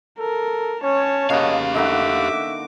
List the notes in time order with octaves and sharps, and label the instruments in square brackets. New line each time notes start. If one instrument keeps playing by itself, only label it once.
[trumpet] A4 [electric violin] A#4
[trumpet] C#4 [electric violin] C#5 A5
[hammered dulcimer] C#3 A#3 F#4 [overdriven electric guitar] G4 F5 [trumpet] D#5
[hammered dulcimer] D3 D#4 F#4 [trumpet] E5 [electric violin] D6